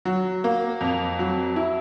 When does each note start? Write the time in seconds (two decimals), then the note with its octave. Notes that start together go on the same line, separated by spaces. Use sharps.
0.05 F#3
0.44 A#3
0.81 F2
1.19 F#3
1.56 E4